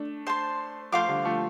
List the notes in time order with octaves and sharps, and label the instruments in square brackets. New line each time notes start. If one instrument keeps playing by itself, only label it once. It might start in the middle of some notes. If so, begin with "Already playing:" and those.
Already playing: [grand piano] A3 D4
[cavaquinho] C5 A5 C6
[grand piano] F3 A3 [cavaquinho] C5 F5 D6
[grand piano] D3 G3
F3 A3